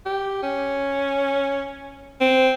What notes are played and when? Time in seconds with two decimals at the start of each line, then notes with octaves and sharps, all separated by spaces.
0.06 G4
0.43 C#4
2.21 C4